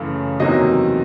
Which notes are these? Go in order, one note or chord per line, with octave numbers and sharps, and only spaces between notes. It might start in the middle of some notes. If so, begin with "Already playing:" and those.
Already playing: F#2 C#3 E3 A3
E2 C3 D#3 F#3 A#3 D#5